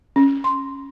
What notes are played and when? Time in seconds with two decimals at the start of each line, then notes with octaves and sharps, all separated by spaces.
0.16 C#4
0.44 C6